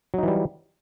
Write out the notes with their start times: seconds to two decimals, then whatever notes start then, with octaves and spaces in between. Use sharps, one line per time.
0.14 F#3
0.18 D#4
0.23 E3
0.28 G3